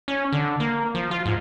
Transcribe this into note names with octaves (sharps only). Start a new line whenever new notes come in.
C#4
D3
A#3
F3
F4
G#2